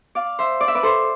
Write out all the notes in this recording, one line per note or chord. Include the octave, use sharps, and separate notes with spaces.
D5 F5
C5 E5
D5
E5
B4 D5
A4 C5